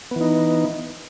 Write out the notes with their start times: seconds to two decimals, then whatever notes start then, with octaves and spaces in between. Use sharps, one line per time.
0.11 B3
0.16 E3
0.21 D#4